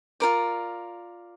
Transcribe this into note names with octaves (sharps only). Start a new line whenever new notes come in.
F4 A#4 D5